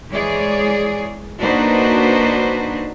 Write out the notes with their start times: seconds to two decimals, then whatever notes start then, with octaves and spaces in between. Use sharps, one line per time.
0.11 E3 G#3 G#4 C#5 D5
1.39 A#3 D4 D#4 F#4 B4 C5